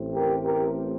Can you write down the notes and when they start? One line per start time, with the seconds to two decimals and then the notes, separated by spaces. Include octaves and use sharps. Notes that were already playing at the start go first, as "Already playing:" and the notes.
Already playing: A1 A2 A3 C4
0.14 G4 A#4
0.44 G4 A#4